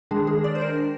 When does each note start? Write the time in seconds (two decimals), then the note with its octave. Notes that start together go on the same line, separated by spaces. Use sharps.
0.11 D#3 G#3 D4 G#4
0.27 G#4
0.44 D5
0.55 C5
0.61 A#4